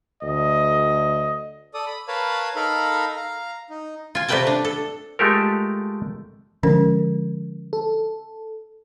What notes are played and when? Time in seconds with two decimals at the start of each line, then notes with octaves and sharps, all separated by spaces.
0.23 D2 D#5
1.74 A4 D5 D#6
1.86 B5
2.08 A#4 B4 C#5 F5 A5 B5
2.56 D#4 A4 A#4 F5 A#5 B5
3.16 F5 A#5
3.70 D#4
4.15 F4 G#5
4.28 C3 G3 A3 B4 G5 A5
4.47 D4
4.65 A4
5.19 G#3 A3 F4 G4 A4 A#4
6.63 D3 F3 G#3 C#4 A#4
7.73 A4